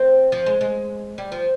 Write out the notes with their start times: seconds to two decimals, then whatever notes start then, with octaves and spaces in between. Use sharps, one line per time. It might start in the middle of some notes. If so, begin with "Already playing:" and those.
Already playing: C4
0.32 F3
0.46 G#3
0.61 G#3
1.18 G3
1.32 F3